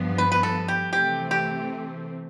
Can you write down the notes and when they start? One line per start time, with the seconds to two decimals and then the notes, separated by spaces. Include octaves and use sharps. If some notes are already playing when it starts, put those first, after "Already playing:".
Already playing: G2 F3 B3
0.18 B4
0.32 B4
0.43 A4
0.68 G4
0.93 C3 E3 A3 C4 G4
1.31 G4